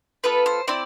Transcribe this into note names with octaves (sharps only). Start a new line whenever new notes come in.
B3 F4 A4 B4
C5
C4 E4 D5